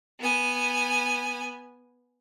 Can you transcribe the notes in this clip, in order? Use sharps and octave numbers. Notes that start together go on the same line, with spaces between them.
B3 G#5